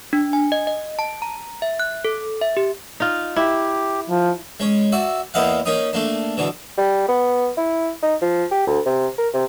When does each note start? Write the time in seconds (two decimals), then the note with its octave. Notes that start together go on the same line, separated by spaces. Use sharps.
0.13 D4
0.33 G#5
0.52 D#5
0.67 D#5
0.99 A5
1.22 A#5
1.62 E5
1.80 F#6
2.05 A4
2.41 E5
2.57 G4
3.00 D#4 F4
3.36 E4 G4
4.10 F3
4.60 G#3 C#4
4.92 F#4 D5 E5
5.34 E2 A#3 E4 D#5 F5 F#5
5.65 A#3 C#4 D#4 D#6
5.93 A3 A#3 D4
6.37 B2 D3 E3
6.78 G3
7.08 B3
7.58 E4
8.02 D#4
8.22 F3
8.52 G4
8.67 D2
8.86 C3
9.18 A#4
9.34 C3